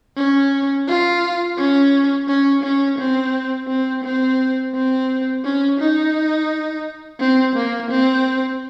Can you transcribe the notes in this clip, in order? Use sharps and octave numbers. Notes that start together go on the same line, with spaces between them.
C#4
F4
C#4
C#4
C#4
C4
C4
C4
C4
C#4
D#4
C4
A#3
C4